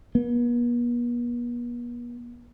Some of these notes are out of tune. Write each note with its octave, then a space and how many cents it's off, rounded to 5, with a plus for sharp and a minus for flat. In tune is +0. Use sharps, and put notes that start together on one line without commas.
B3 -45